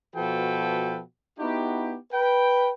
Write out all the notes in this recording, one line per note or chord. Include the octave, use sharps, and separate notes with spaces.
B2 F3 F#4 A4 B4 G5
B3 D#4 E4 F#4 G4
B4 G5